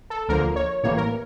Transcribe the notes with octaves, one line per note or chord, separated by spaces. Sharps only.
A4
D2 D3 F3 A#3 A#4
C#5
A1 A2 E3 G3 A#3 C#5
A#4